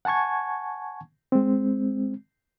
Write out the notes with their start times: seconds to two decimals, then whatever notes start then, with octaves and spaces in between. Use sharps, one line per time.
0.05 F#5 G#5 A5 C#6 G#6
1.32 G#3 C4